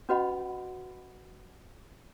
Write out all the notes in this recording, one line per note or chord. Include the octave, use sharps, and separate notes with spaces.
C#4 F#4 B4 D#5 F#5 B5